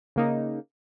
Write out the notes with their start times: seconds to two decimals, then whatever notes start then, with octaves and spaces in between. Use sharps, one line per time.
0.16 C#3 A#3 D#4